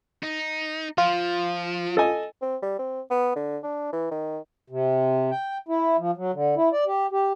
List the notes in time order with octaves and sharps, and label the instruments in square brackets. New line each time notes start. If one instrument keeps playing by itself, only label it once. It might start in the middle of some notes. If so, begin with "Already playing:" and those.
[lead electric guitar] D#4
[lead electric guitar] F3 [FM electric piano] F4
[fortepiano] A4 D#5 G#5
[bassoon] C4
G3
C4
B3
D3
D4
E3
D#3
[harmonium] C3
G5
E4
F3
F#3
D3
E4
D5
G4
G4